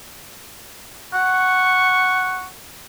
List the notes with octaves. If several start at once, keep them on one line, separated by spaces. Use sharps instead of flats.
F#5 C#6